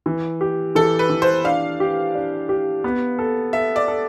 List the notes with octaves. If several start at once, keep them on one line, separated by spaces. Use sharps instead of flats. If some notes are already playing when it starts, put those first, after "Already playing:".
E3
G4
E3 A4
B4
E3
C5
D4 F5
G4
D4
G4
B3
A4
A4 E5
D5
A4